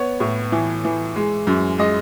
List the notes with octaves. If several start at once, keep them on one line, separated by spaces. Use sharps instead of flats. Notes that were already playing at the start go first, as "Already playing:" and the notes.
Already playing: B3 C#5
A2
E3
E3
G#3
F#2
G#3 D#5